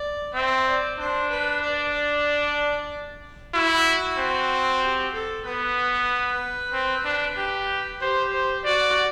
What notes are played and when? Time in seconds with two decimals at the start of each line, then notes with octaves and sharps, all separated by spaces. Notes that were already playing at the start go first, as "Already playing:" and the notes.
Already playing: D5
0.34 C4 E5
0.67 D5
0.99 D4 C5
1.30 B4
1.62 D5
1.94 D5
3.54 E4 F#4
4.17 C4
4.82 G4
5.13 A4
5.45 B3 B4
6.73 C4
7.05 D4
7.37 G4
8.01 G4 C5
8.33 C5
8.65 F#4 D5